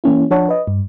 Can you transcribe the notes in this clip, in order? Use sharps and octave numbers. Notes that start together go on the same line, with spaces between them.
E3 A#3 C#4 E4
F3 D4 C#5 F#5 A5
B4 D#5
G2